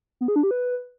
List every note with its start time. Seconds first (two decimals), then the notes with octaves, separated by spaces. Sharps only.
0.21 B3
0.28 G#4
0.36 D4
0.43 G4
0.51 B4